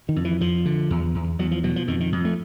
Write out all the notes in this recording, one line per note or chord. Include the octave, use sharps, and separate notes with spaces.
D#3
F2
E3
F2 F3
D3
E2
E2
E2 F#3
F3
B2 F#3
F3
F2 D#3
D#3
F2
A3